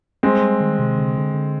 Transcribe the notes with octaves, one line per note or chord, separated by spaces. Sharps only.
G3 G#3 C4
G3
D#3
C3
D3
D3
D3